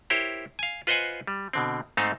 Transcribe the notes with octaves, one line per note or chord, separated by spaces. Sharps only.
E4 G4 A#4 C5 C#5
F5 G#5
F4 B4 C5 D#5 F#5 G#5
G3
B2 D3 C4
G#2 A3 C4 D#4 F5 A5